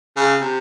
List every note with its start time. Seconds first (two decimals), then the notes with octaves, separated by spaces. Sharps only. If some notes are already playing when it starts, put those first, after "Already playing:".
0.17 C#3
0.42 C3